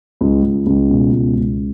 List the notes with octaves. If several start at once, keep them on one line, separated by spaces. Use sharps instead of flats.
C#2
C#2
C#2
B2
C#2
C#2